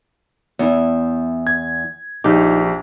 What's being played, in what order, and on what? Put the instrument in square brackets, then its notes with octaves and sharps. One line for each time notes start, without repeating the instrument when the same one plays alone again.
[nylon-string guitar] E2 E4
[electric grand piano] G#6
[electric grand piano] A#1 G4 D6 [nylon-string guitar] D#4